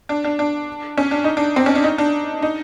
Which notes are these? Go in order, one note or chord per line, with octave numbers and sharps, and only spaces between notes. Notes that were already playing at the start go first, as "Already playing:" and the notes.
D4
D4
D4
C#4
D4
D#4
D4
C4
C#4
D4
D#4
D4
D#4